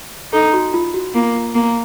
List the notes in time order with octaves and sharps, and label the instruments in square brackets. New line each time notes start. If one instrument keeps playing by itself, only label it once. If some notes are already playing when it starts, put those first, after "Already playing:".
[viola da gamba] D#4 [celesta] A4
[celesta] F#4
F4
F#4
[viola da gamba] A#3 [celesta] F4
[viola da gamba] A#3